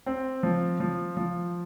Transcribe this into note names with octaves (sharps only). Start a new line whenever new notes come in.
C4
F3
F3
F3